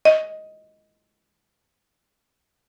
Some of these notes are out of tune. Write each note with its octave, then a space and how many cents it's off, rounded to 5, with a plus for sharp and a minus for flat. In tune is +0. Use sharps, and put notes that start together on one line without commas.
D#5 +10